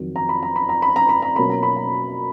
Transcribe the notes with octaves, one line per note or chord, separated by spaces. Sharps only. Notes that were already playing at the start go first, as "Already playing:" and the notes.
Already playing: F2 D#3 F#3
A#5
B5
A#5
B5
A#5
B5
A#5
B5
A#5
B2 F#3 A#3 C#4 B5
A#5
B5
A#5